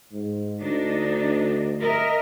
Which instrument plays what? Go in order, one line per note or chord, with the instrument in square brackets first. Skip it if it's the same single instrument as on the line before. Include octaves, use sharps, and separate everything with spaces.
[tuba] G#2
[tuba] D2 [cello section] D4 D#4
[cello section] A#4 D#5 E5